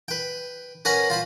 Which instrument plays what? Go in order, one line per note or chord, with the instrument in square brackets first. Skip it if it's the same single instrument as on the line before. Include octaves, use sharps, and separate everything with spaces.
[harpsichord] B4 G5
C#4 A#4 B4 F#5 G#5 A#5
F4 C5 B5